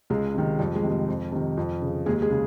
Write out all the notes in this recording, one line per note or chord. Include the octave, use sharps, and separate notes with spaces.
C#2 G#3
C3 D#3
F2 G3
G#3
C3 D#3
G#3
F2
C3 D#3
F2
C#3
D#2 G#3 G#4
G#3 G#4
C#3